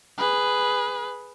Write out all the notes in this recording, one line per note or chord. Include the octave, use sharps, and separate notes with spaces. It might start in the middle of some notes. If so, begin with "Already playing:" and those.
G#4 B4